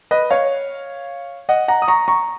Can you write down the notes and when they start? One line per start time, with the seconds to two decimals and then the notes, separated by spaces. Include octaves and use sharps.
0.11 B4 D#5
0.31 C#5 F5
1.49 D#5 F#5
1.68 F#5 A#5
1.82 D#6
1.88 A#5 C#6
2.08 A#5 C#6